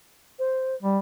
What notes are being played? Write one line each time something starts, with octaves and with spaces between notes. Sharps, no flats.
C5
G3